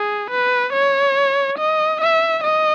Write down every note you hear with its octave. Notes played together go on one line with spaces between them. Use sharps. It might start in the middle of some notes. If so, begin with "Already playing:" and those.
Already playing: G#4
B4
C#5
D#5
E5
D#5